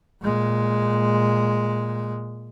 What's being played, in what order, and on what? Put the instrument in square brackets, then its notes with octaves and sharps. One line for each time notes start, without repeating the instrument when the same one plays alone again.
[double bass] A#2 G#3